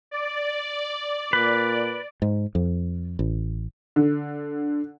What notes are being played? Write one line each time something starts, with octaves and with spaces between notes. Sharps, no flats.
D5
A#2 B4
G#2
F2
A1
D3